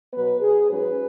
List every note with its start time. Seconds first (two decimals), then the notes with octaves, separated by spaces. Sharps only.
0.13 B2 F#3 B3 B4
0.42 G#4
0.70 G#2 F#3 C#4 B4